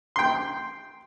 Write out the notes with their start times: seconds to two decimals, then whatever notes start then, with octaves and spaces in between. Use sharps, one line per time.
0.16 G5 C6